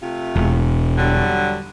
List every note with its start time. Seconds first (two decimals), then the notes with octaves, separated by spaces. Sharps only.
0.02 C3 A3 F4
0.36 E1
0.98 D3 F#3 G3